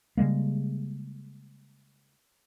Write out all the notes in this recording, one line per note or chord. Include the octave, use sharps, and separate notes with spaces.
C#3 G3 G#3 A#3